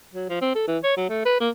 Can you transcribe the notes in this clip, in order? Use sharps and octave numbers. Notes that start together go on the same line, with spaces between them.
F#3
F3
C4
A4
E3
C#5
F#3
A3
B4
A#3